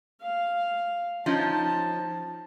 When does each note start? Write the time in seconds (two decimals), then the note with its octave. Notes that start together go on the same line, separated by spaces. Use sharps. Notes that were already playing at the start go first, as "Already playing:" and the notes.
0.21 F5
1.26 F3 C#4 D#4 A5